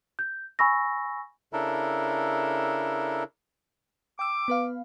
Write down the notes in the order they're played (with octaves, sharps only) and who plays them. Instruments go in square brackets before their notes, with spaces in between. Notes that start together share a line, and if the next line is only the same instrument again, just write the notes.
[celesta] G6
G#5 B5 C#6 E6 A#6
[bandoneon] C#3 D4 E4 A4 A#4
[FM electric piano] G5 E6 [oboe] D6
[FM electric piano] B3 B4 F5